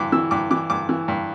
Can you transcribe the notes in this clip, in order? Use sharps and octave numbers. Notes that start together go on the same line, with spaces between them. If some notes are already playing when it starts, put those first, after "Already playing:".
Already playing: G2 E3 D6
E3 E6
G2 D6
E3 D6
G2 D6
E3
G2